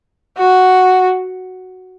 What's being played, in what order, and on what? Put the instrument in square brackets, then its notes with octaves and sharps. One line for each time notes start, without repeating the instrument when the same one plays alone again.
[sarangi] F#4